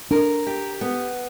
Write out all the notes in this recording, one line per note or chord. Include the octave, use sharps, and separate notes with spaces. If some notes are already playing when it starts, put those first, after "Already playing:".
D4 A#4
G4
B3